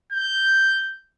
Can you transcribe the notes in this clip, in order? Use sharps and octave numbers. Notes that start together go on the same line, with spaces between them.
G6